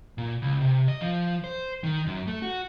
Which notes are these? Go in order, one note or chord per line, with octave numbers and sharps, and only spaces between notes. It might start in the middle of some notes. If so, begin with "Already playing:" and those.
A#2
C#2
C3
D#5
F3
C5
D#3
F#2
A3
F#4